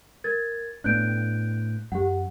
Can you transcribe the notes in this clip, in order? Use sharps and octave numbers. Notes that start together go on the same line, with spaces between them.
A#4 G#6 A6
A2 B3 D4 F#6 G6 D7
F#2 G4 F#5